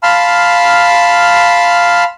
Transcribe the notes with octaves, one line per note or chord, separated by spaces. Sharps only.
F5 A5 B5 C6 F6